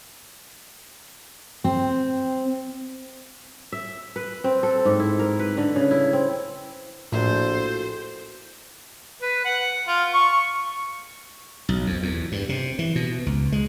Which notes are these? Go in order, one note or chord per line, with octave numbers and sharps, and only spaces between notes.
C4
E5
B4
C4
A4
G#2
E4
A#4
B4
D3
C#3
E4
C4
A#1 A2 E4 F#4 A4 C5
B4
F#5
F4
C#6
B1
F2
E2
G2
C3
E3
B2
C#2
G#3